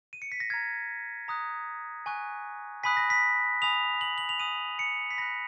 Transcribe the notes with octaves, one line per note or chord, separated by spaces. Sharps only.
D#7
C#7
B6
A#6
A#5 F6 G#6
A#5 D#6 F#6
G#5 C#6 F#6
G#5 B5 D#6 F#6 B6
A#6
B6
G#5 B5 D#6 F7
F#7
F#7
F7
G#5 D#6 F#6 D#7
C#7
B6
B5 F#6 A#6